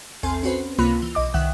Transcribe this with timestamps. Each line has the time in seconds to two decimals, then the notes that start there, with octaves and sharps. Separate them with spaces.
0.23 A#1 E2 C4 A4 G#5 C6
0.43 C4 C#4 F#4 B4 C5
0.79 C#2 C3 A#3 F4 B5 F#6
1.02 E3
1.15 B1 D#5 D6
1.34 C2 D#3 E5 F#5 G5 F#6